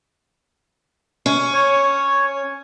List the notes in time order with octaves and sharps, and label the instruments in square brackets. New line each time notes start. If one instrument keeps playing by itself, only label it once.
[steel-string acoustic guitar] C#4
[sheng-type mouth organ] C#5